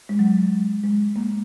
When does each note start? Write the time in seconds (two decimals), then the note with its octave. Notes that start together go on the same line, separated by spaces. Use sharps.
0.09 G#3
0.19 F#3
0.84 G#3
1.16 A#3